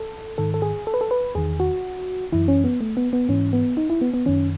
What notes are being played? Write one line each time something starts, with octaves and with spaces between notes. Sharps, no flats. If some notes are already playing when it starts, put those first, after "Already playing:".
Already playing: A4
G#2 D#3 A4
A4
G#4
A4
B4
A4
B4
E2 D#3 G#4
F#4
F#2 E3 E4
C#4
B3
A3
B3
B3
G#2 E3 C#4
B3
D#4
E4
B3
B3
F#2 D#3 C#4